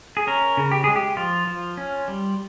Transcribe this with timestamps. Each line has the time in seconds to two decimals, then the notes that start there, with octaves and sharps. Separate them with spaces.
0.17 G#4
0.27 C#4 A#4
0.57 C#3
0.71 G4
0.84 G#3 G#4
0.96 G4
1.17 F3 F4
1.47 F3
1.77 C#4
2.08 G3